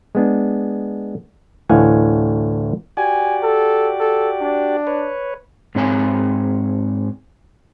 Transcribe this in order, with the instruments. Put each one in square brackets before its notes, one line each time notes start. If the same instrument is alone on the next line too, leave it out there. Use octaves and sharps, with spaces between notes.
[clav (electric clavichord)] G#3 B3 D4
D2 A2 E3 F5 F#5 G#5
[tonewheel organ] F#4 G4 D5 [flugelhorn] G#5
[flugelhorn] A4
A4
D4
[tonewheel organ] B4 C#5
[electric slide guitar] G#2 C4 C#5 G#5